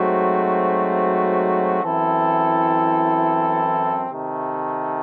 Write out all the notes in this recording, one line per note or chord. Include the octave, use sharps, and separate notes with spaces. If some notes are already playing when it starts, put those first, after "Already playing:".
Already playing: G#2 F#3 A3 C4 F#4
F#2 E3 C4 E4 A4
C3 D#3 A3